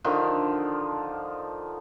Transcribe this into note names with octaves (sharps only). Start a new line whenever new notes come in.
D3 D#3 F3